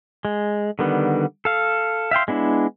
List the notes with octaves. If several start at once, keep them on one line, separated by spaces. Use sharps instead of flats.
G#3
D3 D#3 G3 B3
A4 F5
E5 F5 G5 C6
G#3 B3 D4 E4